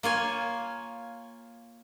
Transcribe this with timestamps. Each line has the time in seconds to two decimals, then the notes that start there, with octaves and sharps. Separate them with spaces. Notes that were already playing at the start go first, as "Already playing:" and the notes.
0.03 A#3 F4 C#5 G#5